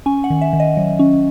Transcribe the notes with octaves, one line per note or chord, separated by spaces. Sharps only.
C#4 G#5
F#5
D#3
E5
D#3
D#5
F#3
C#4